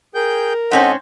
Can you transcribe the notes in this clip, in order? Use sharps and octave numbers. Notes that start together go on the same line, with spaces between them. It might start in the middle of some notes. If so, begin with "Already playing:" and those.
G#4 A#4 G5 G6
G#2 C4 C#4 A4 C5 D#5 F#5